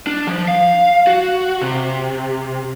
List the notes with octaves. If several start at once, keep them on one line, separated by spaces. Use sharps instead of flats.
D4
F3
F5
F#4
C3